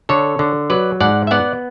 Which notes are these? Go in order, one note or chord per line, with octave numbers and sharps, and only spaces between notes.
D3 A4 C#5
D3
F#3 B4 D5
G#2 D5 F#5
E5
B3 D5 F#5